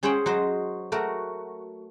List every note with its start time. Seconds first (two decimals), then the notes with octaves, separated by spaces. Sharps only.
0.03 C#4 G#4 C5 C#5 F#5 G5
0.26 F#3 F#4 C5 D#5
0.92 A3 F#4 A#4